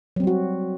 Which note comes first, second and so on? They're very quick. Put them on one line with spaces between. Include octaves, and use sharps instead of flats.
F#3 C4 G3 F#4